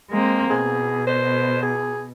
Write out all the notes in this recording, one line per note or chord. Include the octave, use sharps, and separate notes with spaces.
G#3 A#3 C4
B2 G#4
C5
G#4